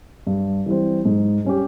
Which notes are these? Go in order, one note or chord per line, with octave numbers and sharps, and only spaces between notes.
G2
E3 G3 C4
G#2
G3 C#4 G4